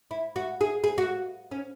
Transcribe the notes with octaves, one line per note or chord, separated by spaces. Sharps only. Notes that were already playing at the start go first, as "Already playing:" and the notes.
E4
F#4
G#4
G#4
F#4
C#4